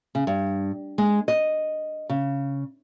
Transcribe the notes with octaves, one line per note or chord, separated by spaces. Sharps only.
C#3
G2
G#3
D#5
C#3